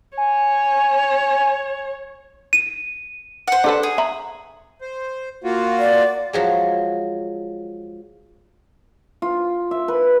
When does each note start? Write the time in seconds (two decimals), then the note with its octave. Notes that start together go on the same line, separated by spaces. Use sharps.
0.17 C#5 G#5
2.53 D#7
3.48 C5 F#5
3.64 D4 A4 B4
3.83 G#4
3.98 E5 A#5 B5
4.81 C5
5.44 A#3 F4 F#4
5.79 D5
6.33 F3 F#3 G#3
9.22 F4
9.71 E5
9.88 B4